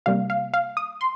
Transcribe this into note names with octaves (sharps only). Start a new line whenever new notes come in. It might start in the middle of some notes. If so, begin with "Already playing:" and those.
C3 G3 A#3 F5
F5
F5
D#6
C6